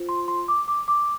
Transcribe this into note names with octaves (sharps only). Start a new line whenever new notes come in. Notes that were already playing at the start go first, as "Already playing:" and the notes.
Already playing: F4 C5
C6
C6
D6
D6
D6